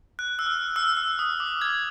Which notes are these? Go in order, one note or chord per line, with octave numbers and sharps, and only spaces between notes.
F#6
E6
F6
E6
E6
D#6
D6
G#6